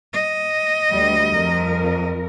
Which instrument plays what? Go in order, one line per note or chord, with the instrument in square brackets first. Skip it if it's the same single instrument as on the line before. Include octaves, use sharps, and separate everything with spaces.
[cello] D#5
[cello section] D2 G3
F2 A#4